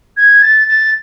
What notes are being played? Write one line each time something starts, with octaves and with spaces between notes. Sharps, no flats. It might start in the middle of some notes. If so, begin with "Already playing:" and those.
G#6
A6
A6